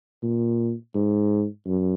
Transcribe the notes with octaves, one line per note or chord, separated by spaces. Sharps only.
A#2
G#2
F#2